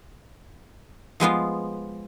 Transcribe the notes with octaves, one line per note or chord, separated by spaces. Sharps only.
F3 G#3 B3 F4